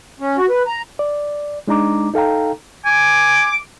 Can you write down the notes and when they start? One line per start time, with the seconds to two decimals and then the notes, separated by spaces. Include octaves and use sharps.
0.20 C#4
0.37 F#4
0.49 B4
0.67 A#5
0.99 D5
1.67 G#3 D4 D#4 A#5 D6
2.14 D#4 A4 F5 G5 A#5
2.86 G#5 D6